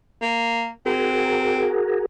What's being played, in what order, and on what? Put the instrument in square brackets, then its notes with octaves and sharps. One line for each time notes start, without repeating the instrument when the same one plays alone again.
[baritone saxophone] A#3
[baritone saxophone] C4 [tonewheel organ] F#4 G#4 A#4